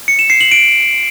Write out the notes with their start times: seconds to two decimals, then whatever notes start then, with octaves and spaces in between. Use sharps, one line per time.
0.08 C#7
0.19 E7
0.30 C7
0.41 F#7
0.51 D7